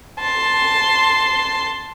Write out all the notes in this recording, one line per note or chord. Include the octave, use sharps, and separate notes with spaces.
A5 C6